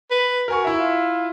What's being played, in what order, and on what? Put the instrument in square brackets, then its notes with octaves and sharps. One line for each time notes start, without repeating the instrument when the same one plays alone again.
[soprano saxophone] B4
[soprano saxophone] F#4 [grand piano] A#4 G#5 C#6
[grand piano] E4 E5
[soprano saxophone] F4